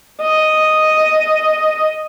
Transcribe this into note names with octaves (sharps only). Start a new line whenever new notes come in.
D#5